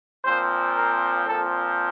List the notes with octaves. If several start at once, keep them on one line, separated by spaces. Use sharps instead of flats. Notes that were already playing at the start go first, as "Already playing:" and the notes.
A#2 F3 C4 C5
A#4
A#2 F3 C4 A4